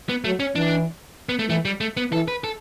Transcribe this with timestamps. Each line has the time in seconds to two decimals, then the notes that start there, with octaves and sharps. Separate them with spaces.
0.09 B3
0.24 F#3 A3
0.40 C#4
0.55 E3 D4
1.29 B3
1.39 A3
1.50 E3 A3
1.65 G3
1.81 A3
1.97 B3
2.12 E3 A4
2.28 B4
2.44 A4